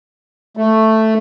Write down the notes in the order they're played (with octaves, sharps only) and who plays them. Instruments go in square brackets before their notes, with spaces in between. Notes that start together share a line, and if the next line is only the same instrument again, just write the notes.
[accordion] A3